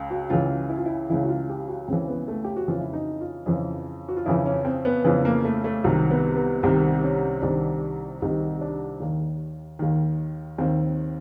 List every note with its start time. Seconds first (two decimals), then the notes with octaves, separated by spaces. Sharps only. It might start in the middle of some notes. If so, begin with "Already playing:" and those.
Already playing: C#2 C#3
0.11 F#4
0.30 C#2 C#3 E3 F4
0.69 E4
0.77 F4
0.86 E4
1.10 C#2 C#3 E3 E4
1.23 F#4
1.29 F4
1.49 G4
1.68 F#4
1.88 C#2 C#3 E3 C4
2.08 B3
2.28 A3
2.44 G4
2.56 F#4
2.68 F2 C#3 E3 F4
2.81 E4
2.93 D#4
3.21 F4
3.46 F2 C#3 E3
4.09 F#4
4.17 F4
4.26 F2 C#3 E3 E4
4.46 C#4
4.65 C4
4.85 B3
5.05 F2 C#3 E3 B3
5.25 A#3
5.45 A3
5.64 A3
5.84 C2 C3 D#3 F#3
6.10 B3
6.36 B3
6.63 C2 C3 D#3 C4
7.03 C#4
7.42 C2 C3 D#3 D4
8.22 C2 C3 D#3 D#4
8.61 D4
9.00 D#2 D#3
9.79 D#2 D#3
10.58 D#2 D#3 C4